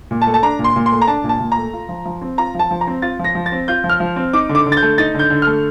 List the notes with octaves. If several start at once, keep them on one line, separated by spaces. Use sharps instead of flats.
A#2
A5
A3
A5
D4 A#5
A#2
C6
A#2
C6
A3
A#5
D4 A5
A#2
A5
A#2
A#5
A3
F4
F3
F3
C4
F4 A#5
F3 A5
F3
A#5
C4
F4 A6
F3
A#6
F3
A6
C4
F4 G6
F3
F6
F3
C4
D#4 D6
D3
D6
D3
A6
G6
A3
D#4 A6
D3 G6
D3
A3 F6